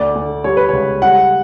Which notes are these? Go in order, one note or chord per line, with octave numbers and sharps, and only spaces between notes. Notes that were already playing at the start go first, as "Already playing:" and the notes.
Already playing: D2 D5
D2
G3 C#5
B4
C#2 C#5
G3 F#5